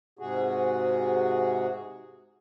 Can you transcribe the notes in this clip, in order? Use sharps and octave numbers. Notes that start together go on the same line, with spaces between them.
G#2 C3 F#4 G#4